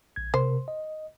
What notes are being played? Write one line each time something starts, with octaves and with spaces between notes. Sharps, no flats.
A#1 G#6
C3 A#4 C5
D#5